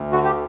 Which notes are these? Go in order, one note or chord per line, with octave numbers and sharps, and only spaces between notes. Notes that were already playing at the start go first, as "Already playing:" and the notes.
Already playing: D2
D3 F#4
G4